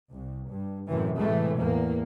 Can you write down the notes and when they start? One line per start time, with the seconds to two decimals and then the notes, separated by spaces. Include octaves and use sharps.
0.11 C2
0.50 G2
0.88 F#2 A2 C3 E3
1.19 A2 C3 E3 G#3 A3
1.59 E2 A2 A#3